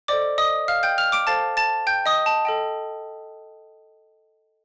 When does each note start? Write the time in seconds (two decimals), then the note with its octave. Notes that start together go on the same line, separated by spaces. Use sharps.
0.08 A4 C5 D5 D#5 D6
0.38 D#5 D#6
0.68 F5 F6
0.83 G5 G6
0.98 F6 F7
1.12 D6 D7
1.27 A4 C5 F5 A5 A6
1.57 A5 A6
1.87 G5 G6
2.06 D#5 D#6
2.26 A5
2.45 A4 D#5 G5